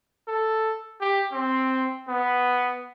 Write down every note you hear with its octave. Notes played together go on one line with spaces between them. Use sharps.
A4
G4
C4
B3